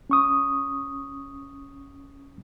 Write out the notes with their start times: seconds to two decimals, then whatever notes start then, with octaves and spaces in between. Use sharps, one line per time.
0.10 C#4 C#6 D#6